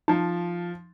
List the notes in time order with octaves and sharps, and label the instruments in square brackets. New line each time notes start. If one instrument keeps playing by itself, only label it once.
[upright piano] F3 A5 [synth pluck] D#4